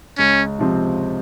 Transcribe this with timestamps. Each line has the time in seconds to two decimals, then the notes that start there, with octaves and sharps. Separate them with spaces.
0.18 C#2 C#4
0.59 C3 F3 C4